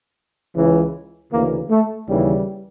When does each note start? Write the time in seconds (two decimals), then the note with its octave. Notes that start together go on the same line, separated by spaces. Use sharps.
0.56 C#2 C#3 E3
1.32 D2 C#3 E3 A#3
1.70 A3
2.08 D#2 C#3 E3 G3